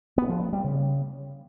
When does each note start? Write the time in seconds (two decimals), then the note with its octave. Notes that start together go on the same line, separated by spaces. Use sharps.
0.18 B3
0.29 F3
0.41 A#3
0.53 G3
0.64 C#3